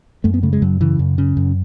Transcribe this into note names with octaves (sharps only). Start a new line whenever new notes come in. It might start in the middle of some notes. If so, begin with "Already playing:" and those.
F#2 A3
B3
C#3 A3
G#3
F#2 F#3
C#3 E3
F#2
C#3
F#2